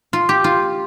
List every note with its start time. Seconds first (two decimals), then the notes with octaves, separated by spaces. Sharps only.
0.13 F4
0.29 G4
0.44 F4